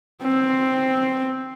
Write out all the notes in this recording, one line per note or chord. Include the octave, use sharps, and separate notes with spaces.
C4